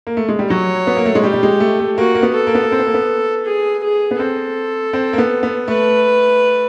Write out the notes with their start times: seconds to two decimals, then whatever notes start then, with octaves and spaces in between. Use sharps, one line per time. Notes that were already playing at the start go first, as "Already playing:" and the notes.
0.07 A#3
0.17 A3
0.29 G#3
0.39 G3
0.50 F#3 C#5
0.87 B3
0.97 A#3
1.05 A3
1.15 G#3
1.23 G3 G4
1.34 G3
1.43 G#3
1.60 A3
1.80 A3
1.98 A#3 F#4
2.15 A#3
2.23 B3
2.34 A4
2.47 A#3
2.55 B3
2.63 A#3
2.72 C4
2.79 B3
2.87 A#3
2.94 B3
3.46 G#4
3.83 G#4
4.11 B3
4.19 C4 A4
4.93 C4
5.13 A#3
5.18 B3
5.43 B3
5.68 A3 B4